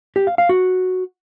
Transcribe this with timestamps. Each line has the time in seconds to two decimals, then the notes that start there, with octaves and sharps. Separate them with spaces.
0.16 G4
0.27 F5
0.38 F5
0.49 F#4